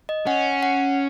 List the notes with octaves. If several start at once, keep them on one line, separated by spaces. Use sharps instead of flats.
D#5
C#4 F#5
F#5